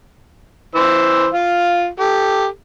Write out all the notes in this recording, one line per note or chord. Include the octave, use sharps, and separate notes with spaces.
E3 C5 E6
F4 F5
G4 A4